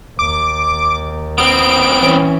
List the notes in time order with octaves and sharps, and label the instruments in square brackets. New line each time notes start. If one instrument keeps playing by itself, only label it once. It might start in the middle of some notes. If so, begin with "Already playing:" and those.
[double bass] D#2 [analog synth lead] D6
[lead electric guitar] B3 C4 [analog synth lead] D7
[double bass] E3 C#4